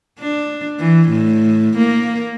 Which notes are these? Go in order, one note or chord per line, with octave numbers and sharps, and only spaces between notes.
D4
E3
A2
A#3